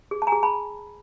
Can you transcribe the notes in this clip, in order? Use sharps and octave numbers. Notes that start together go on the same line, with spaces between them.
G#4
A5
G#5 A#5
G#4
A5 B5